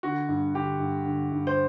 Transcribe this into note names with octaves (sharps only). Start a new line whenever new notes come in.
D3 F#4
G2
D3 G4
G2
D3
G2
C5